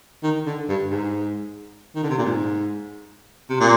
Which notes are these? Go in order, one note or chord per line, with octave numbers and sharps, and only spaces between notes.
D#3
D3
G2
G#2
D#3
D3
C3
A#2
G#2
C3
A#2